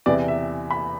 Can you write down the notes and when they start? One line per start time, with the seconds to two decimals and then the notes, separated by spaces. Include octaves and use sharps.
0.06 E2 C3 E3 D5
0.28 E5
0.71 B5